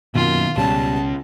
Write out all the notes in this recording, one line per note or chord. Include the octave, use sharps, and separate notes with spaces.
F#2 B2 D#3 A#3 F4
C#2 B2 G3 C#4 A5